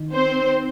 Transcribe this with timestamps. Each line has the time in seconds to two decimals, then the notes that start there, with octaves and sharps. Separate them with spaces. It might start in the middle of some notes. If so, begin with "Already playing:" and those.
Already playing: D#3
0.12 C4 C5